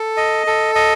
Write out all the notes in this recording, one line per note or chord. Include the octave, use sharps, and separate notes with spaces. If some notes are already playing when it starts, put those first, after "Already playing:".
Already playing: A4
D#5
A4
D#5